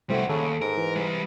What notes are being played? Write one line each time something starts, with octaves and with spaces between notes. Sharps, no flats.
C2 G3 A3 C4 F#4
D#2 C#3 A4
G#2 A#4
E3
G3 E4